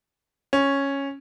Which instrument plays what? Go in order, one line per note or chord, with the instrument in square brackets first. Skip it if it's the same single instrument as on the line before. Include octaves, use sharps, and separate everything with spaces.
[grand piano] C#4